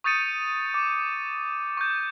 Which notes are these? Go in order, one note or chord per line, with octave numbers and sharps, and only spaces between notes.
C#6 D#6 G6 A6 C#7 D#7
D6
C#6 D6 G6